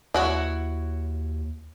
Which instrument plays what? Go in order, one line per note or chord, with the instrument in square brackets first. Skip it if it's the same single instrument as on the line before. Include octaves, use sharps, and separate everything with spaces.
[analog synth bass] D#2 [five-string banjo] E4 F#4 C#5